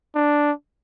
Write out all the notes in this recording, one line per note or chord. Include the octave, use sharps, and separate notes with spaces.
D4